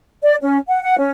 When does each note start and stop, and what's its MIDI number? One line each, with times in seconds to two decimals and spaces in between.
0.23 0.34 74
0.41 0.57 61
0.68 0.81 78
0.82 0.97 78
0.98 1.10 61